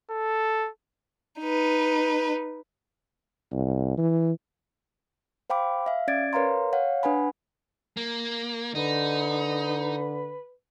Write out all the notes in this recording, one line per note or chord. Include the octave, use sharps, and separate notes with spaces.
A4
D#4 B4
C2
E3
C5 F5 G5 B5 D6
E5 F5
C#4 D5 G#6 A6 D7
A#4 B4 C#5 F5 A#5 C6
C#5 F5 F#5
D4 B4 F#5 G#5 B5
A#3
D3 D#4 B4